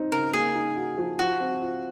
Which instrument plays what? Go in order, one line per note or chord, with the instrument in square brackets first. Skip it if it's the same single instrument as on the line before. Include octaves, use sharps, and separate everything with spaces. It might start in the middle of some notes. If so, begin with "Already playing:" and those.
Already playing: [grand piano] C4 D#4
[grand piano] C#3 [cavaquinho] A#4
[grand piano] A#3 [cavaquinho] G#4
[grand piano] D#4
F#4
F3
[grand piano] F3 [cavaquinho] F#4
[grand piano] C4
F4